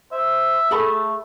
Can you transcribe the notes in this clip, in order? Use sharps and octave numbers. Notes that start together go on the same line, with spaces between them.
C5 E5
A3 G#4 A4 B5